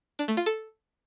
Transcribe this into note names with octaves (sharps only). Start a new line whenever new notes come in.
D4
A3
F4
A4